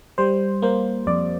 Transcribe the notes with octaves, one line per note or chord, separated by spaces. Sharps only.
G3 C5
A#3 C5
F2 D5